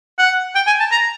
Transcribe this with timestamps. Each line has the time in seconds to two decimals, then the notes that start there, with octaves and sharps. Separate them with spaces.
0.19 F#5
0.55 G5
0.67 G#5
0.80 A5
0.91 A#5